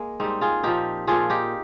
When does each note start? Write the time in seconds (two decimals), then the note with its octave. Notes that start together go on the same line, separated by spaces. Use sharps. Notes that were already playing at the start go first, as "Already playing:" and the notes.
Already playing: G#3 A#3
0.20 G#2 G3 C4 D#4
0.41 F4 G#4
0.63 A#2 F3 D#4 G4
1.07 A#2 F3 F4 G#4
1.30 D#4 G4